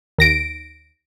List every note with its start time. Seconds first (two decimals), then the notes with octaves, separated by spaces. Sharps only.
0.18 D#2 A#6 D7